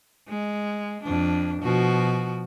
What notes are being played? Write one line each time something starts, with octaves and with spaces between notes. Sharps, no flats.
G#3
F2 D4
B2 F3 F#4